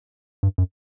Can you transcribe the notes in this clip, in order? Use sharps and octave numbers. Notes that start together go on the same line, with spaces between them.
G2
F#2